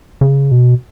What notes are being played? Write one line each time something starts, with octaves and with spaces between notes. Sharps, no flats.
C#3
B2